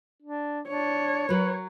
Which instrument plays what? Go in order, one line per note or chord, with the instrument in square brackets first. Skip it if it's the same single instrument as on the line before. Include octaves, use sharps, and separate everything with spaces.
[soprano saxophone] D4
[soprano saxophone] D4 [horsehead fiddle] C#5
[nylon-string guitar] F#3 A#4 [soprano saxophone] B4